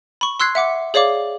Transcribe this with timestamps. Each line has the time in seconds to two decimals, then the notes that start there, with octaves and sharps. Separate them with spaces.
0.21 B5 C#6
0.40 C6 E6 F#6 G#6 C7
0.55 E5 F#5 D6 C#7
0.94 G#4 C#5 D5 F5 D6